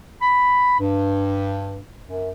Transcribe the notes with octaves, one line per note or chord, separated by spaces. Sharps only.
B5
G2
F#2